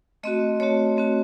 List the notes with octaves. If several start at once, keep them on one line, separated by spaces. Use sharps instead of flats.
A3 C4 F#4 D#5
A3 C4 F#4 C#5
A3 C4 F#4